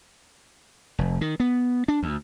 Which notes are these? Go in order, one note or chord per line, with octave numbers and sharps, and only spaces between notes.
F1
D#3
B3
D4
D2